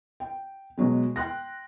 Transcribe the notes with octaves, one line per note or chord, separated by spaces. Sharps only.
G5
B2 F#3 G#3
G5 C6 F#6 A#6